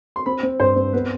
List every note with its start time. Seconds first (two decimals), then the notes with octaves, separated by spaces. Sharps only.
0.16 C6
0.26 C4 B5
0.43 C4
0.60 G2 C5
0.76 C4
0.93 B3 B4